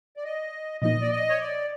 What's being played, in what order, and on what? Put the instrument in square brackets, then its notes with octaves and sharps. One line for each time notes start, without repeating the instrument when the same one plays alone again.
[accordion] D5
D#5
[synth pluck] A#2 F3 A#3 D#4 [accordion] D#5
[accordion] D5
D#5
C#5
D5